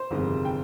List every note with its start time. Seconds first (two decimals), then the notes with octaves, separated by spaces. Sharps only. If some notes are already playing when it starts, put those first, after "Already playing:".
Already playing: C5
0.11 G1 F2 C3 D#3 G#3
0.45 G5